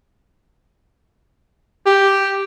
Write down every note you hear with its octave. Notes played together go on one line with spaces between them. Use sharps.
G4